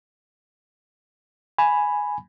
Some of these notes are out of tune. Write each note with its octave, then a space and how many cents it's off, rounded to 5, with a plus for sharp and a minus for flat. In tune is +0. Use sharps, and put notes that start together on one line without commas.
G#5 +0 B5 +0